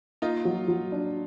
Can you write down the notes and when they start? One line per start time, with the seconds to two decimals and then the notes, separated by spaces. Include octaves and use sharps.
0.22 A#3 D#4 F4
0.45 F#3
0.68 F#3
0.92 D4